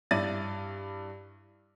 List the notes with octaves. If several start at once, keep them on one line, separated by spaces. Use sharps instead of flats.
G2 E4 D5 A6 D#7